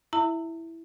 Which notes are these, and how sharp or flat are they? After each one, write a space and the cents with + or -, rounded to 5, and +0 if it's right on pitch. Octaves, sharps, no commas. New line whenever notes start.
E4 +0 E5 +0 A#5 -40